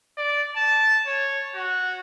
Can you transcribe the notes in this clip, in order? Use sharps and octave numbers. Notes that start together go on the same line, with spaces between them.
D5
A5
C#5
F#4